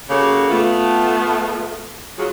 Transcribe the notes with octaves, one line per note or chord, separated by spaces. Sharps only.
C#3 A#3 F#4 G4 A4 C#5
A3 B3 F4
F#3 F4 G#4